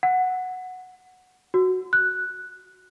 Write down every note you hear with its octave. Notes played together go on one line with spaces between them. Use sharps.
F#5
F#4
F#6